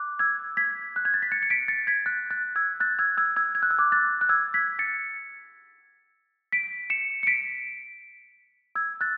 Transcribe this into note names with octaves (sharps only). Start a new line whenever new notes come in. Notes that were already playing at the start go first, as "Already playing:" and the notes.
Already playing: D6 F#6
E6 G#6
G#6 B6
F#6
G#6
A6
B6
A6 C#7
C#7
B6 D7
A6 C#7
G#6 B6
F#6 A6
F#6 A6
E6 G#6
F#6 A6
E6 G#6
E6 G#6
E6 G#6
G#6
F#6
E6
D6 F#6
F#6 A6
F#6
E6 G#6
G#6 B6
A6 C#7
B6 D7
C#7 E7
C#7
B6 D7
E6 G#6
F#6 A6